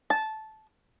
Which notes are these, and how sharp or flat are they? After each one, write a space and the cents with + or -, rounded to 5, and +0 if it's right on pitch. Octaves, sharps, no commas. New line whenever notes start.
A5 -15